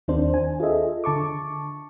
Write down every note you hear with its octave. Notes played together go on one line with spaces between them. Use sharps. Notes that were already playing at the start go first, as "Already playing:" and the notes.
D#2 D#3 C4 D4 C5
G#5
F4 G#4 A4 D#5 E5
D3 A5 C#6 D6